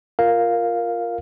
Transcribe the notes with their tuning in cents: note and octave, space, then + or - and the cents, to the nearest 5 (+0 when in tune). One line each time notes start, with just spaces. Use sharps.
F4 +0 A#4 +0 F5 +0